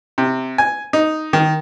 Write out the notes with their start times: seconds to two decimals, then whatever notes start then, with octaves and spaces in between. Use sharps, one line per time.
0.18 C3
0.58 G#5
0.93 D#4
1.33 D#3